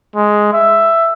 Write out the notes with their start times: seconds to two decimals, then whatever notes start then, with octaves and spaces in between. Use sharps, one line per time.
0.16 G#3
0.53 E5